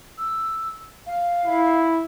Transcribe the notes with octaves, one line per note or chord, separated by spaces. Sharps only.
E6
F5
E4